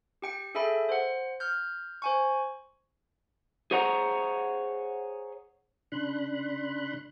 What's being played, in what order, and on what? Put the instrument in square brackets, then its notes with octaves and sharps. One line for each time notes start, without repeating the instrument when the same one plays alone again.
[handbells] G4 G5 C#7
G#4 A4 E5 G5 B5
C5 F#5
F6 G6
C5 G#5 C#6
[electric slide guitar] G#4 C5 C#5 F#5 A#5
[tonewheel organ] C#3 D4 B5 C6 F#6